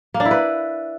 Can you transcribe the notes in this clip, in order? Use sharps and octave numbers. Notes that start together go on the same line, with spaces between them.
A#3
D4
E4
B4